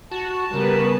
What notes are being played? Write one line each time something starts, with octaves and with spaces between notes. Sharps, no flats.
F#4 A5
C#3 G3 B3 A#4 B4